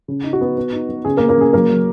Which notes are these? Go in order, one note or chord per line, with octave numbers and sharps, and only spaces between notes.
C#3
D#4
F#4
B3
B3
D#4
B3
C#3 G#4
A#3 A#4
C#3
A#3 A#4
C#3 G#4
F#3 A#3 A#4
F#3